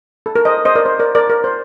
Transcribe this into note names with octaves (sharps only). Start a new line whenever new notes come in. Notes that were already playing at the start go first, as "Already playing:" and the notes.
A4
A#4
C5 D#5
C5 D#5
A#4 D5
C5
A#4 D5
A#4 D5
A#4
C5